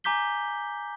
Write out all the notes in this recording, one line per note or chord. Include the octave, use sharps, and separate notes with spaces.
G#5 A#5 D6 G6 B6 G7